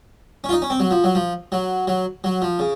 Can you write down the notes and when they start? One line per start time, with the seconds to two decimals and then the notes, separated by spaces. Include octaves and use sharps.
0.44 C#4
0.49 F4
0.53 D#4
0.62 C#4
0.70 C4
0.80 F#3
0.91 F3
1.04 F#3
1.15 F3
1.52 F#3
1.87 F#3
2.24 F#3
2.42 F3
2.59 C#3